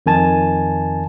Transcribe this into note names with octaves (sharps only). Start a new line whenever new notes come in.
F2 D#3 G#5 A5